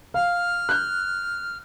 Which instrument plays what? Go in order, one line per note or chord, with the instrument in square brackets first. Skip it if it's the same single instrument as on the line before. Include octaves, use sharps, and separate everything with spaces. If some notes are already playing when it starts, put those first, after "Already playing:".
[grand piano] F5 [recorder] F6
[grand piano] F#6 G6